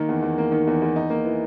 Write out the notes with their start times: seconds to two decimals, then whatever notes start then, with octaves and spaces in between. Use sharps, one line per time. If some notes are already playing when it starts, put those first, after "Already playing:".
Already playing: D#3 A#3
0.09 E2
0.22 E2
0.38 A#3
0.52 D#3
0.67 E2
0.82 E2
0.96 D#4
1.10 A#3
1.25 E3